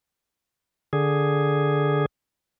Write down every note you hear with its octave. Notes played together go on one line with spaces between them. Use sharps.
D3 G#4